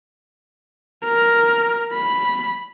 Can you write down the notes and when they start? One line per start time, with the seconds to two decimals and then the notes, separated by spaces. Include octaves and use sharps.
1.04 A#4
1.93 B5